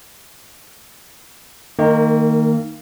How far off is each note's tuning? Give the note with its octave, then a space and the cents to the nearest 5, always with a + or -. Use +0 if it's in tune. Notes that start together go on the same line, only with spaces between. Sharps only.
D#3 +0 A#3 -30 D#4 +0